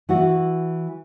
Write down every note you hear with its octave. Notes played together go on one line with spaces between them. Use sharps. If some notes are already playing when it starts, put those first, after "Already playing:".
E3 E4 F#4